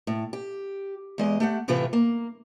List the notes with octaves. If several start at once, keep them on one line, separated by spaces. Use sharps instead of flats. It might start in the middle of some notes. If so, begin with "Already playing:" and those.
A2
G4
E2 G#3 D#5
A3 G4 F#5
A2 C3 E3 A3 F4 B4
A#3